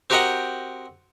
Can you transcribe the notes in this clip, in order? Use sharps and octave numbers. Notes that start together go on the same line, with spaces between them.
C4 F#4 G4 A#4 D#5 F#5